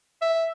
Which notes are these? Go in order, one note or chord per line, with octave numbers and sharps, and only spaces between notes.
E5